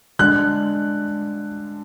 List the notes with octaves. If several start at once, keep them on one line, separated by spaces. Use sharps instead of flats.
D3 G#3 D4 F#6